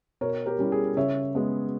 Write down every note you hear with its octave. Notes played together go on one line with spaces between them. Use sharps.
B2 A#4 C#5
G4 A#4
G3 C#4 E4
G#4
C#3 C#5 E5
G#3 B3